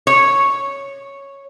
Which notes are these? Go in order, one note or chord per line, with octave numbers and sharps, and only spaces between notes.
C#5